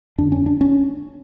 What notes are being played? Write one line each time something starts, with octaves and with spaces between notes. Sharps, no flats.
F2 D3 D4
C#4
D4
C#4